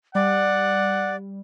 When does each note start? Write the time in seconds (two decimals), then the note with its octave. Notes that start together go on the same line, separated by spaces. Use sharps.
0.15 G3 D5 F#5